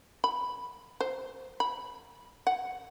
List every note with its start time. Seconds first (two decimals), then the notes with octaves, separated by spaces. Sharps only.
0.24 B5
1.01 C5
1.60 B5
2.47 F#5